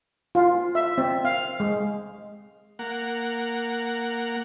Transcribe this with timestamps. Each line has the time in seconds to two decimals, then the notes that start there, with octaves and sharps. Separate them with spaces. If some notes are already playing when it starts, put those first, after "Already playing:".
0.35 F4
0.75 E5
0.98 C4
1.25 F5
1.60 G#3
2.79 A#3 F#5